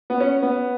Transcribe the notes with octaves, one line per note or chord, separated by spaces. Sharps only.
B3
C#4
B3